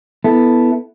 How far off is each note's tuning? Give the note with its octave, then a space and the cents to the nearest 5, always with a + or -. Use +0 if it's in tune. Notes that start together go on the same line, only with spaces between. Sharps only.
B3 +0 E4 -5 A4 +0